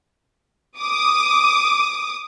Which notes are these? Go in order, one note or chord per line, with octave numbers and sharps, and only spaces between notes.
D6 D#6